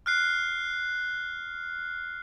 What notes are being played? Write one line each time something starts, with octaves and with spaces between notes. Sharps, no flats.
F6 F#6 C7